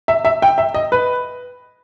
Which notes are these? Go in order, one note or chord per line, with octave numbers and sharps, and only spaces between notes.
E5
E5
G5
E5
D#5
B4